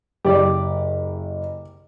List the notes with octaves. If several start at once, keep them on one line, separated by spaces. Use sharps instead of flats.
F#1 G4 D5